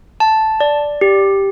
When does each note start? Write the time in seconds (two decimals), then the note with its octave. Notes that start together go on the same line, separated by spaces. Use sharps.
0.20 A5
0.60 D5
1.01 G4